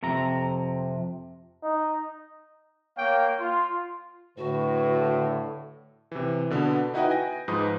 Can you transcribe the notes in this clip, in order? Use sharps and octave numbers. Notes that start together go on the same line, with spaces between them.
F2 C3 A#5
D#4
A#3 C#5 F5 G5
F4
A2 D3 F#4 B4
C3 E3
B2 D3 B3
D#4 E4 F#4 B4 D#5 G5
G5 G#5 A#6
G#2 F3 B4 D#6